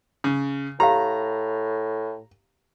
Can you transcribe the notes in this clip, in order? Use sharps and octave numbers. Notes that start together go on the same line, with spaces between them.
C#3
A2 G4 F5 A#5